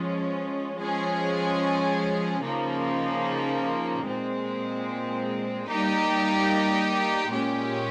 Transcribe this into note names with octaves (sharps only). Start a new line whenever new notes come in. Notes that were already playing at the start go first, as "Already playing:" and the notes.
Already playing: F3 G#3 C#4
F3 G#3 C#4 G#4
C#3 F3 A#3 D#4
A#2 G#3 C4
G3 A#3 D#4 G4
A#2 G#3 C#4 G4